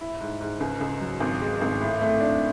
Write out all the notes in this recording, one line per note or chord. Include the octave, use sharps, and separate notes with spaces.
E4
G#2
G#2
C#2
C#2
F#3
G#1
G#3
G#1
A2
A3
D4